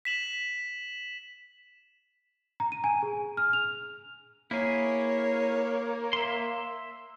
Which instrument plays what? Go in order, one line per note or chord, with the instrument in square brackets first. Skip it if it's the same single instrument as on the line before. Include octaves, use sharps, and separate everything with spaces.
[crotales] B6 E7 F#7
[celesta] A#5
D#7
G#5
G#4
F6
F7
[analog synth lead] A#3 [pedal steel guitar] E4 G#4 [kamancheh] C#5
[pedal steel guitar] E5 C6